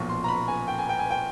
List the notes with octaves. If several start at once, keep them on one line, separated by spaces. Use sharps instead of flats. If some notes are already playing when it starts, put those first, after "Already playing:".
Already playing: B1 A#2 F3 C#6
C6
A#5
B5
G#5
G5
G#5
G5
G#5
G5